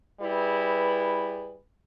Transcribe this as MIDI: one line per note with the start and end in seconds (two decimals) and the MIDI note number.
0.21 1.58 55
0.21 1.58 64
0.21 1.58 68
0.21 1.58 71